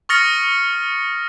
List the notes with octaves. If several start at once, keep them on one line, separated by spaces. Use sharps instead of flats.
C#6 D#6 F6 A6 A#6 C#7